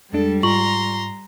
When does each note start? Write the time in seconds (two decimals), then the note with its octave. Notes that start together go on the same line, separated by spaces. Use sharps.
0.13 F2 G3 G#3 D4 A4
0.43 G#2 F4 A#5 C6 C#6 F#7